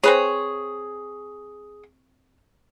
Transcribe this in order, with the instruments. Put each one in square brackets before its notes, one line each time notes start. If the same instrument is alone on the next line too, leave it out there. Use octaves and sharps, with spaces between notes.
[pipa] C4 B4 C#5 [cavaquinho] G#4